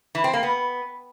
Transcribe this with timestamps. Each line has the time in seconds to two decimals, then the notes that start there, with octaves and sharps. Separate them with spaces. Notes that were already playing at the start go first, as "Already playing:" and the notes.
0.15 E3
0.24 C4
0.33 A#3
0.43 B3